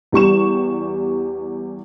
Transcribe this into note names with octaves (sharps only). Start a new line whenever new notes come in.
E2 G3 C#6 E7